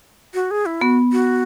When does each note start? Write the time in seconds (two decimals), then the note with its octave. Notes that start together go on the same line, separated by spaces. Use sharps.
0.34 F#4
0.51 G#4
0.66 E4
0.81 B3 F#4
1.13 F#4